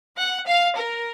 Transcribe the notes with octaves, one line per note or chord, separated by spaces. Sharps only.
F#5
F5
A#4